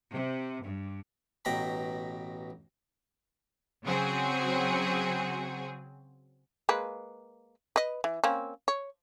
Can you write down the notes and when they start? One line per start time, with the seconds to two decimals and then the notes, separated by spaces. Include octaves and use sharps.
0.11 C3
0.64 G2
1.45 A1 B2 G5 A#5 B5
3.84 C#3 F#3 C4 F#4 G#4
6.69 G#3 A#3 B4
7.76 B4 D#5
8.04 E3
8.24 A#3 C4 C#4
8.68 C#5